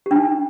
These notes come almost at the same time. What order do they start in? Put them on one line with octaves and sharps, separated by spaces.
G4 D4 D#4